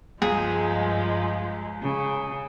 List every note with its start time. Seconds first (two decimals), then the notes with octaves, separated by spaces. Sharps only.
0.22 C#2 G2 F3 G#3 G#4
1.82 C#3